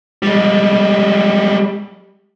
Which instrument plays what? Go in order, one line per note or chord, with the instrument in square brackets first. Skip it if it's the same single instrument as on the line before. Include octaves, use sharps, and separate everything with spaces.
[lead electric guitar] G3 G#3